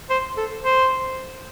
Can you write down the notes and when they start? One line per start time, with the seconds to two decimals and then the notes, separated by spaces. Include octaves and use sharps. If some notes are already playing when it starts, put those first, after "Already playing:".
0.10 C5
0.37 A4
0.63 C5